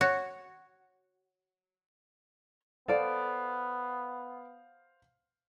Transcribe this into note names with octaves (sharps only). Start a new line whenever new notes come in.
F#4 C#5
B3 A4 C5 D5 F5